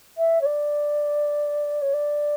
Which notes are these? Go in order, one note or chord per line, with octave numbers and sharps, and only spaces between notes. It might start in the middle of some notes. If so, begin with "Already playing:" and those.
E5
C#5
D5
C#5
D5